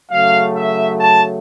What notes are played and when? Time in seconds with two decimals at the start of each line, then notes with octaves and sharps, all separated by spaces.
0.10 C#3 F#3 A3 F5
0.56 E5
1.00 A5